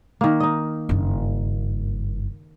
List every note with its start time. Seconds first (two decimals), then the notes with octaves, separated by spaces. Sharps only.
0.21 D#3 A#3
0.40 D#4 D#5
0.89 F#1 G2